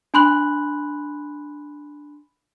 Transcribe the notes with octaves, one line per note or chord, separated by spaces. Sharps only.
D4 G#5 B5 C6 F#6 F#7